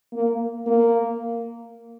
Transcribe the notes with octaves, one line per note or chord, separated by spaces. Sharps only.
A#3
A#3